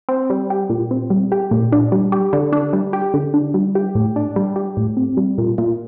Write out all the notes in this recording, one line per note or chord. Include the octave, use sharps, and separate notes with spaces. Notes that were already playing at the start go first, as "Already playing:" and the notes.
C4
G3
G4
A#2
C4
G3
G4
A#2
D4
G3
G4
D3
D4
G3
G4
D3
D4
G3
G4
A2
D4
G3
G4
A2
C4
G3
A#2
A#2